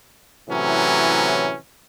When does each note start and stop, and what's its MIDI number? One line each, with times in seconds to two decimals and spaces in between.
0.50 1.56 45
0.50 1.56 48
0.50 1.56 52
0.50 1.56 54
0.50 1.56 61